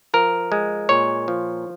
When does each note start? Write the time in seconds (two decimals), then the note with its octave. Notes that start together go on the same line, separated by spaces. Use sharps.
0.14 F3 A#4
0.52 G#3
0.89 A#2 C#5
1.28 F3